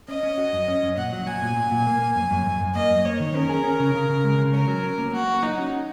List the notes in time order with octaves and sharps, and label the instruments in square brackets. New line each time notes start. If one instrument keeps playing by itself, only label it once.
[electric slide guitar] C#4 [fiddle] D#5
[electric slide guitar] C#4
F#4
F#2
C#4
F#2
[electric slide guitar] A#2 [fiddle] F#5
[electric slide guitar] F#3
[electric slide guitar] F#3 [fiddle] G#5
[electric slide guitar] A#2
A#2
A#2
A#3
A#3
F#2
F#2
F#2
F#2
[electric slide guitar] A#3 [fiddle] D#5
[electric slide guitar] F#2
[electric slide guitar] A#3 [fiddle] C#5
[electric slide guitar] D#3
[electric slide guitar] C#4 [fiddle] A#4
[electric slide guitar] G#4
C#4
C#3
C#3
C#3
G#3
C#3
[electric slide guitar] C#4 [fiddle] A#4
[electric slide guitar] F#3
C#4
A#3
[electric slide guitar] A#3 [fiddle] F#4
[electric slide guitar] A#3
[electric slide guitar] F#3 [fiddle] D#4
[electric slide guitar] C#4